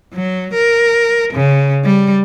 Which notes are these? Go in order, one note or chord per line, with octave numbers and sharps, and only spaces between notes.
F#3
A#4
C#3
G3